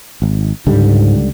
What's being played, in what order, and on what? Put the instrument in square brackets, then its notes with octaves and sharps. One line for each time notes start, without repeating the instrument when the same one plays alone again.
[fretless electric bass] G#1
[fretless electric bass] C#2 D3 G3 [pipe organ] G#2